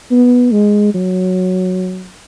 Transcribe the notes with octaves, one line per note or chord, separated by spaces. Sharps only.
B3
G#3
F#3